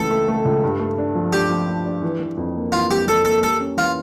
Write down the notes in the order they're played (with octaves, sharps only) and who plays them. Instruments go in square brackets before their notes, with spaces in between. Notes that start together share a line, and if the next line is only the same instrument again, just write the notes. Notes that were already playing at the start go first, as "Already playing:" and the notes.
Already playing: [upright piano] C#2 C#3 E3 A3 [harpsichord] A4
[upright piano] A3
A3
C#2
G2
A3
D4
F3
[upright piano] D4 [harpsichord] G4
[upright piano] F3
D4
D4
E3
E3
F2
A#3
[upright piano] E3 [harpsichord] F4
[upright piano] F2 [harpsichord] G4
[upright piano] F2 [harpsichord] A4
[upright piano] A#3 [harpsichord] A4
[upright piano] G3 [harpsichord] A4
[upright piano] C#4
[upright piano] E3 [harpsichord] F4